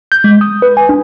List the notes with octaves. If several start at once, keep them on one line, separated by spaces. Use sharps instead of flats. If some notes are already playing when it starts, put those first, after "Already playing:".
G6
G#3
D#6
B4
G#5
D4